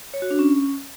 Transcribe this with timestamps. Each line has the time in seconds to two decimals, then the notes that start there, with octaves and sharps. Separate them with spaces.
0.14 C#5
0.22 F#4
0.30 D4
0.39 C#4